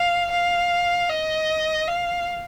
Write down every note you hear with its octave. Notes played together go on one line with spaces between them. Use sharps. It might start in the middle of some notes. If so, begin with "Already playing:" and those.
Already playing: F5
F5
D#5
F5